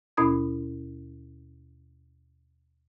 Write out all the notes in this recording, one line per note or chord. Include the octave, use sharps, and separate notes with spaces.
D#2 B2 C#4 E4 D#6 G#6